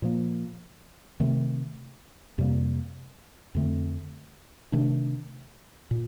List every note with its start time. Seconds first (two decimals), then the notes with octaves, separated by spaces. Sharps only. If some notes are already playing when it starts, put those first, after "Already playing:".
0.02 A#2 F3 A#3
1.20 C3 D#3 A3 C4
2.38 F2 C3 G3 A#3
3.55 F2 D3 A3 C4
4.72 C3 D#3 A3 D4
5.91 A#2